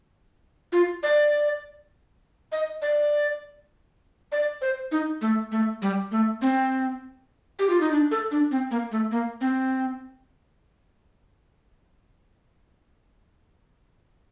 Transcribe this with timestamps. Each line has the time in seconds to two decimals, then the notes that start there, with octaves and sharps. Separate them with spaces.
0.72 F4
1.03 D5
2.52 D#5
2.82 D5
4.32 D5
4.61 C5
4.92 D#4
5.21 A3
5.52 A3
5.82 G3
6.11 A3
6.42 C4
7.59 G4
7.70 F4
7.81 D#4
7.92 D4
8.11 A4
8.31 D4
8.51 C4
8.71 A#3
8.92 A3
9.11 A#3
9.41 C4